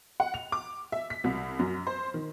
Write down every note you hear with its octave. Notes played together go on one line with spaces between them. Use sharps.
F#5
F7
D6
E5
B6
C2
F#2
C5
D#3